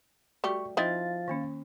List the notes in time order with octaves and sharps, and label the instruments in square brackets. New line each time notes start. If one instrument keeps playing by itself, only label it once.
[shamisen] G3 A3 G4 [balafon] F#4 [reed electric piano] C#6
[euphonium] F3 [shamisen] C4 D#4 E4 [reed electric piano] F5 A6
[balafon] D#3 A#3 C#4